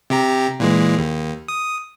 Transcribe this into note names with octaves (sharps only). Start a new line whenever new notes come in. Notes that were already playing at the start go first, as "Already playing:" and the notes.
C3 G4 A#5
A#2 E3 G#3
D#2
D#6